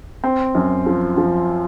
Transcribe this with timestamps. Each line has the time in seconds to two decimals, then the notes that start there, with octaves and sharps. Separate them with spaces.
0.24 C4
0.55 F#2
0.86 F3
1.18 F3